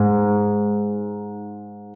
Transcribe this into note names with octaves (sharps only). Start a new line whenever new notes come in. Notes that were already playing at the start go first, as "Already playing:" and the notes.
Already playing: G#2